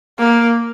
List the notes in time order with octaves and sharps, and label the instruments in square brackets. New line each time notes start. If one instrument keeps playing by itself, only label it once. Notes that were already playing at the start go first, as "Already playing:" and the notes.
[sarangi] A#3